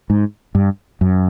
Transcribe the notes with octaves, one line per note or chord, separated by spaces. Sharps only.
G#2
G2
F#2